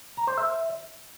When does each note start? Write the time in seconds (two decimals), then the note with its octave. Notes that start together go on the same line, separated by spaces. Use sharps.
0.17 A#5
0.27 C5
0.38 E5